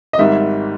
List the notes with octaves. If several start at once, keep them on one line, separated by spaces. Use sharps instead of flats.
D#5
G#1 G#2 D#3 G3 E5